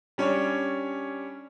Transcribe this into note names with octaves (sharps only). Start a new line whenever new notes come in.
G3 C#4 D4 C#5